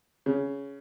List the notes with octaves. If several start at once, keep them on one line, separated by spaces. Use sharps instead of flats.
C#3